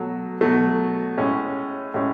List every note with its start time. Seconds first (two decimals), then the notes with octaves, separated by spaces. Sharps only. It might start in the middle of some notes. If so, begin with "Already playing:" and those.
Already playing: B2 F#3 A3
0.41 B2 F#3 A3
1.17 A2 G#3 C#4
1.94 A2 G#3 C#4